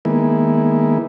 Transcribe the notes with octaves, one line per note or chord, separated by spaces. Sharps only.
D#3 G#3 A#3 B3 E4